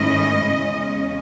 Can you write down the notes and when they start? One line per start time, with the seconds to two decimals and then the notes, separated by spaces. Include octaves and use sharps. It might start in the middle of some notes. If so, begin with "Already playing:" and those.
Already playing: G#2 D#3 A3 C#4 E4 D#5
0.42 E2 C#3 G#3 C#4